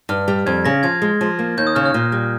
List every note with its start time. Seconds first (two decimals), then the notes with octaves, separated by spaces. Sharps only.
0.09 G2 F6
0.28 G3
0.46 F2 G#6
0.65 C#3 A#6
0.83 F3 G#6
1.02 G#3
1.21 F3
1.39 A#3
1.58 D#2 G6
1.67 D#6
1.75 C#3 F6
1.86 F6
1.94 A#2
2.12 G3